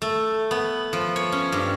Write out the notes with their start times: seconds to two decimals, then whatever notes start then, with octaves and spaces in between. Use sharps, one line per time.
0.02 A3
0.51 B3
0.93 F3
1.16 C#5
1.32 C#4
1.52 G2